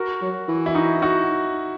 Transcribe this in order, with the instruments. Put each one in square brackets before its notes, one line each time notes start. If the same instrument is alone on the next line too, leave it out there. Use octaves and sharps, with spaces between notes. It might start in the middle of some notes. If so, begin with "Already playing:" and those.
Already playing: [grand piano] F#4 A#4
[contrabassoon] F#3
E3
[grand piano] E4
D#4 F#4
D#4 F#4